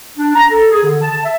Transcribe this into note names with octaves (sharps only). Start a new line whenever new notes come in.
D4
A#5
A4
G#4
D3
A5
E5